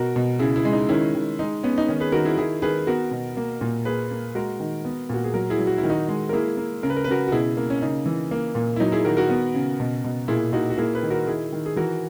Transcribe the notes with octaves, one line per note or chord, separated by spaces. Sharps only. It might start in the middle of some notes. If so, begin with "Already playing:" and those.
Already playing: B2 F#4 A#4
B2
C#3 E4 G#4
E4 G#4
G#3
D#4
D#3 C#4 E4
D#3
G#3 D#4
B3 C#4
D#4
D#3 C#4
G#4 B4
D#3 F#4 A#4
E4 G#4
D#3 E4 G#4
D#3 G#4 B4
B3 F#4 A#4
B2
A#3
A#2
A#3 G#4 B4
A#3
G#3 F#4 A#4
D#3
B3
A#2 F#4
G#4
F#3 F#4 A#4
E4 G#4
F#3
F#4
E4
D#3
D#4 F#4
G#3
A#4
A#3 E4 G#4
A#3
C#3 A#4
B4
A#4
B4
C#3 F#4 A#4
F#4
B2 E4 G#4
A#3
C#4
C#3 D#4
E3
A#3
A#2
E4
F#3 D#4
E4 G#4
D#3 F#4 A#4
F#4 A#4
B3
C#3
B2
B2
A#2 E4 G#4
A#2 D#4 F#4
F#4
A#3 E4 G#4
G#4 B4
D#3
F#4 A#4
D#3 E4 G#4
D#3
G#4
E3 F#4 A#4